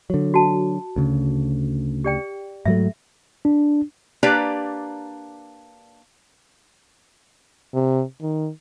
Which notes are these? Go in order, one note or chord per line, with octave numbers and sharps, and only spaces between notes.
D3 F#3
F#4 A5
D2 C#3
G4 D5 G5
G#2 F#3 A3 E5
D4
A#3 D4 G4 B4 D5 A#5
C3
D#3